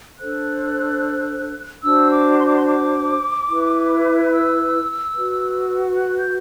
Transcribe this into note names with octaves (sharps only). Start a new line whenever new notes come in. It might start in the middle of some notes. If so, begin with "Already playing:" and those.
D4 A4 C5 F#6
D4 F#4 C5 E6
D6
C6
D6
C6
D6
E4 B4
E6
F#4 B4
F#6
G6